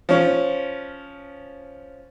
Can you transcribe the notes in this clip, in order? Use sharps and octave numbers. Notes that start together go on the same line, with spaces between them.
F3 C#4